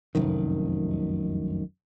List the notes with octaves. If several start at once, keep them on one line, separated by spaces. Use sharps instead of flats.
F1 C2 F#2 D#3